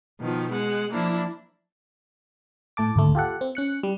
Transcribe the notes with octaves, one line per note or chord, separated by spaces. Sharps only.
B2 D#3 F3
G#3 F#5
F3 A#3 D4 E4
A2 A3 A5 D6
G#1 D2 A3
F4 G4 A4 F#5
C4
C#4 F#6 C#7
G3